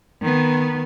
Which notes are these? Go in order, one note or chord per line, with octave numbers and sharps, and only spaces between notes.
D#3 B3